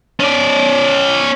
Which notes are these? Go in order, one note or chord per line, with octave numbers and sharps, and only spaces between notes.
C#4 D5